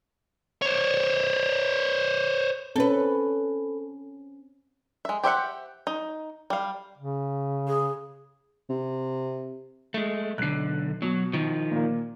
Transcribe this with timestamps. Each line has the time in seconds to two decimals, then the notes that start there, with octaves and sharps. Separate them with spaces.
0.62 C5 C#5
2.76 C4 C#4 A4 B4
5.05 G#3 E5
5.24 G4 C5 E5 F#5
5.87 D#4
6.50 G3 F5
6.98 C#3
7.67 G#4
8.70 C3
9.94 G#3 A3
10.38 B1 D3 F#6 C7
11.02 B2 F#3
11.33 D#3 F3
11.71 A#2 A#3